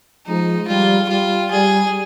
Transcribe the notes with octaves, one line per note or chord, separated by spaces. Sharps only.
F3 G#3 D#4
G3 F4
G3 F4
G3 G#4